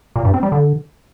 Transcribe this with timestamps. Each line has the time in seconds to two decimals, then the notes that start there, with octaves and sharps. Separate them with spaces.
0.16 A#2
0.25 G2
0.34 C4
0.43 G3
0.52 D3